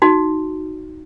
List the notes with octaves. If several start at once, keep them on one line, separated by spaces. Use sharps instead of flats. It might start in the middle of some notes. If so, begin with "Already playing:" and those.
D#4 F#4